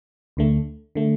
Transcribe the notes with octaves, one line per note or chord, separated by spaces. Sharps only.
D2 D3 A3
D3 A3